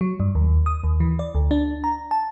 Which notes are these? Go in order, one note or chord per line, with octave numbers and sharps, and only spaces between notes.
F#3
G2
D#2
D#6
D#2
E3
D5
D2
D4
A#5
A5